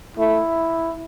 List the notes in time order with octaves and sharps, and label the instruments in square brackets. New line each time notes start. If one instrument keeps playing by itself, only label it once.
[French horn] A3 [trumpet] E4